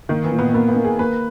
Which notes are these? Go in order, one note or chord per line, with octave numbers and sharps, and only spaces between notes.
D#3 A#3
E3
A#2
B3
A#3 B3
B3
A#3
G#4
A#3 B4